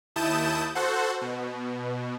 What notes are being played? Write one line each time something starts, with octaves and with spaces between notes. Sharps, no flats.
D#2 E4 A5 D#6 G6 E7
F#4 A4 C5 F#5
B2